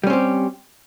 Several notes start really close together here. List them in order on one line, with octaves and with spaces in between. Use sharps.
G3 C#4 C4 G4